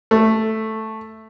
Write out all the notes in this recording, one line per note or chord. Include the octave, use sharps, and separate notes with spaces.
A3